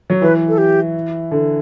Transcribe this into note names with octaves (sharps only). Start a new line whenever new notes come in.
F#3
E3 B4
A4
G4
D3